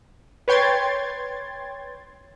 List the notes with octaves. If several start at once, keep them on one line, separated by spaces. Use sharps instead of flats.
B4 C#5 G5 C6 G#6 A6